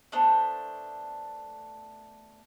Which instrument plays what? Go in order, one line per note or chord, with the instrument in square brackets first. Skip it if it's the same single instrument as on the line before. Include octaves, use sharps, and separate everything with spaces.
[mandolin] A3 B3 D4 C5